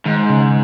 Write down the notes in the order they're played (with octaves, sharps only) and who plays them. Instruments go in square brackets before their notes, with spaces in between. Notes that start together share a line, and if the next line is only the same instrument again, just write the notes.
[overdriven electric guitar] G#2 [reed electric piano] D#3
[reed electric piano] C#3